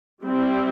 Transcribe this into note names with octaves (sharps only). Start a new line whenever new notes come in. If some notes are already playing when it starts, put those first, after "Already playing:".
G3 C4 E4